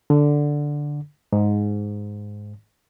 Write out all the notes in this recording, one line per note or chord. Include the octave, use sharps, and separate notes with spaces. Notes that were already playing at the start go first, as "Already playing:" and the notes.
D3
G#2